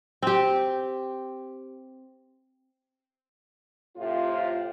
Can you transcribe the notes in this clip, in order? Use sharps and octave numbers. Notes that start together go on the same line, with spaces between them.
C4 G4
A2 C3 F4